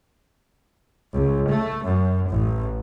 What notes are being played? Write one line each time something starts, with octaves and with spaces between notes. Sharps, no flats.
C#2
A3
F#2
A1